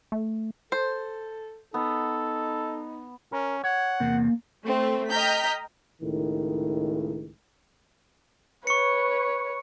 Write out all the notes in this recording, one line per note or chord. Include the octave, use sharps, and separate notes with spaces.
A3
A4 C5
B3 D#4 A4
C#4 A#4
C#5 F#5
E2 C3 A#3
A3 C4
D#5 G5 A#5 F6 G6 B6
C#2 A2 D#3
B4 C#5 C#6 C#7